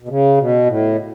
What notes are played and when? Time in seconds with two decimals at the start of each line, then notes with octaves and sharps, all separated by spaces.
0.02 B2
0.08 C#3
0.38 B2
0.66 A2